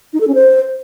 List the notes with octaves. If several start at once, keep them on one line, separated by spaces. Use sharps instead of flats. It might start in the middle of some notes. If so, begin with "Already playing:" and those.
D#4
A4
C#4
C5